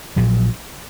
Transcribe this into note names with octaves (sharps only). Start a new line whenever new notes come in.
A#1 A#2 F#3